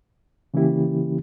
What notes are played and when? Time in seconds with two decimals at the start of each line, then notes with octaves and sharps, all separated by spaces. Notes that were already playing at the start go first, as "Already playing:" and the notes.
0.54 C#3 E3 A#3 C#4 E4 G4